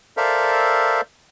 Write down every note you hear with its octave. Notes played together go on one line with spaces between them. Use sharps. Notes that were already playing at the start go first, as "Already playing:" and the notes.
A4 A#4 C5 D5 E5 F5